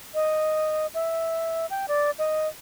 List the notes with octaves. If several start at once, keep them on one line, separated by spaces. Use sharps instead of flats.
D#5
E5
G5
D5
D#5